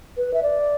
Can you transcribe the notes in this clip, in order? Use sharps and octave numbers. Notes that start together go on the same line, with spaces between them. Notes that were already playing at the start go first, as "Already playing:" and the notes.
B4
E5
D5